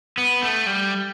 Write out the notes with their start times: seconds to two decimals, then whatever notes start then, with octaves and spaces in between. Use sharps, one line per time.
0.18 B3
0.42 A3
0.67 G3